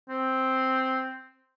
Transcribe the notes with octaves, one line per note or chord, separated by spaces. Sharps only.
C4